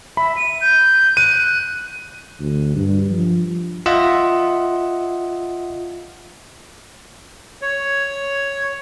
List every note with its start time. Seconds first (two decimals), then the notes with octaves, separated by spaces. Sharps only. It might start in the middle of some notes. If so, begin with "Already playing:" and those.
0.17 E5 B5
0.37 D#7
0.61 G6
1.17 F#6 D#7
2.40 D2
2.75 G2
3.11 F3
3.86 F4 D#5 E5 F#5
7.62 C#5